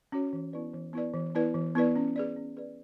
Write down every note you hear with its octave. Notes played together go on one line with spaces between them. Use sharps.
C#4 F#4 C#5
E3
B3 E4 B4 D5
E3
B3 E4 B4 D5
E3
B3 E4 B4 D5
E3
B3 E4 B4 D5
C#4
G#4 B4 D5
C#4
G#4 B4 D5